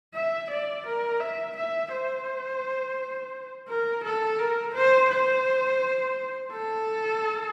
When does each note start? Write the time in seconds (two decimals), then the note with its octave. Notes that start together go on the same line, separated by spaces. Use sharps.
0.14 E5
0.50 D5
0.86 A#4
1.20 E5
1.56 E5
1.92 C5
3.68 A#4
4.04 A4
4.39 A#4
4.74 C5
5.10 C5
6.51 A4